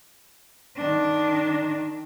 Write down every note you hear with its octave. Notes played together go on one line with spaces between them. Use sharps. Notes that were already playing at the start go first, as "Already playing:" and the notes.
D#3 D4